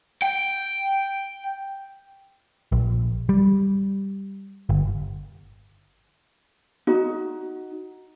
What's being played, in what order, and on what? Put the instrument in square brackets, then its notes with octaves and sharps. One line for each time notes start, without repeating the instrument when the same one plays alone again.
[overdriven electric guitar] G5
[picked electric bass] A#1
G3
G1
[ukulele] D#4 F#4